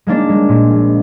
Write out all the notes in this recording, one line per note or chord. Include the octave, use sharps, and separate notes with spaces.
G#3 A#3 D4
G#3
A#2
A#1